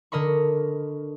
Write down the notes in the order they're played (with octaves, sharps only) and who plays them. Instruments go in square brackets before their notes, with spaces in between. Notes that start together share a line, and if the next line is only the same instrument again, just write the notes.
[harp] D3 A#4 D#5 B5 C#6